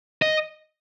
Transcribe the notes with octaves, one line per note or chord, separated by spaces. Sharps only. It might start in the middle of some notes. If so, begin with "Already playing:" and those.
D#5